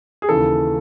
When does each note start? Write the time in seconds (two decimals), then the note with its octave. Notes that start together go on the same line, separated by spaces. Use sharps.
0.22 G#4
0.29 D#2 C#3 E3 A4